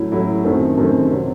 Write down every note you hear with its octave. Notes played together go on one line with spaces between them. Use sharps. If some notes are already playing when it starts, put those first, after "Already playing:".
Already playing: A2 F#3 C#4 E4
A2 F#3 C#4 E4
F#2 D#3 A3 C4
F#2 D#3 A3 C4
C3 F#3